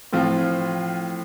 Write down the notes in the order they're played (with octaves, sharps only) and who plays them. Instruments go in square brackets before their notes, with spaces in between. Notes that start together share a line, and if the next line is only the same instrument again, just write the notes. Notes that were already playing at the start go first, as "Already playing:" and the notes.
[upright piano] A2 F3 C4 F4